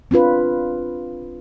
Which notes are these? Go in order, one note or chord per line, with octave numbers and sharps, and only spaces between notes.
C4 D4 F4 B4